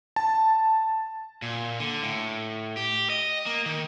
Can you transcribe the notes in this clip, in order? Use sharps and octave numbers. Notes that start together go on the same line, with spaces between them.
A5
A#2
D3
A2
G4
D#5
A#3
D#3